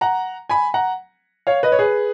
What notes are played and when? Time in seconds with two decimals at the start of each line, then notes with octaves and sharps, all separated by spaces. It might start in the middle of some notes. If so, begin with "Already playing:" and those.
0.01 F#5 A#5
0.49 G#5 B5
0.74 F#5 A#5
1.47 C#5 F5
1.63 B4 D#5
1.72 C#5
1.79 G#4 B4